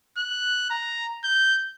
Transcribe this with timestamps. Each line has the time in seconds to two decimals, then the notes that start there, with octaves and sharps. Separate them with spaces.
0.17 F#6
0.70 A#5
1.24 G6